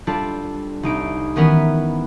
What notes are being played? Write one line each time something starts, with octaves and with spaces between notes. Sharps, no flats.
G3 D4 F4 A4
C2 D#4 D7
D#3 E3 B3 C#4 A#4 B4